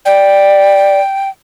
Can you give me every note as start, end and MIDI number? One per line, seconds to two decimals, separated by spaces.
0.06 1.00 74
0.06 1.29 79